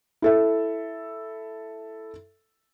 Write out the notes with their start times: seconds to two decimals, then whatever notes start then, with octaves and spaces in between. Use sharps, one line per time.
0.22 E4 A4 E5